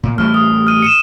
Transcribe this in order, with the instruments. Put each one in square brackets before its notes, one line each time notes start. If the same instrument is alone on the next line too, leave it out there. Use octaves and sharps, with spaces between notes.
[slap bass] A#2
[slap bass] A2 E3 G3 [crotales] F6
[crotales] D#6
F6 D#7
C#7 D#7 E7